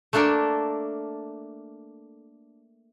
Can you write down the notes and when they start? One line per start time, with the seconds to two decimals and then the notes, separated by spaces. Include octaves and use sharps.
0.13 A3 A#3 D4 A4 A#4